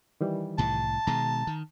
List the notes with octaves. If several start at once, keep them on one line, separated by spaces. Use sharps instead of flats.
D#3 E3 G3
C2 A2 A5
B2 D#3 G#3 A#5
D#3